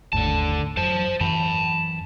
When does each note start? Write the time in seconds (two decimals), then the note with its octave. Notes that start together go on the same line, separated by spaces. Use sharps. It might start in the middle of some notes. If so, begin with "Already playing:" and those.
0.13 G1 D#2 A2 D3 A5
0.77 F#2 C5 A5
1.21 F#2 E3 A5 B5